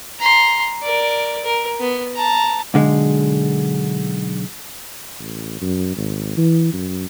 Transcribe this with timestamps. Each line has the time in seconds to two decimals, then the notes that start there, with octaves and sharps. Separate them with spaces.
0.19 A#5 C6
0.83 A#4 D5
1.44 A#4
1.80 B3
2.14 A5 A#5
2.74 B1 D3 G#3
5.19 A1
5.61 F#2
5.97 G#1
6.37 E3
6.73 F#2